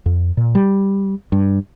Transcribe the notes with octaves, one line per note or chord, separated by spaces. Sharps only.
F2
A#2
G3
G2